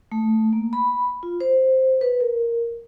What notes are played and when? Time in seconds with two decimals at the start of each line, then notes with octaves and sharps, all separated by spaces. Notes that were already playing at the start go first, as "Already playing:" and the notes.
0.12 A3
0.53 A#3
0.73 B5
1.23 F4
1.41 C5
2.01 B4
2.20 A#4